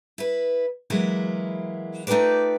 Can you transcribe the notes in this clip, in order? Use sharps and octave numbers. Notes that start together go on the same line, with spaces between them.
E4 B4
E3 F#3 G#3 A#3 E4
A3 D#4 F4 G4 B4 D5